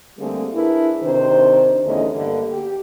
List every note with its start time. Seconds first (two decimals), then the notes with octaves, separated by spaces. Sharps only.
0.19 D3 G3 A3 A#3 C4 G#4
0.55 D4 E4 G#4 A#4 B4
1.03 C3 D#3 D4 C5
1.86 E2 D3 A3 C#4 D#4 D#5
2.16 G2 D3 G3 A#3
2.50 G4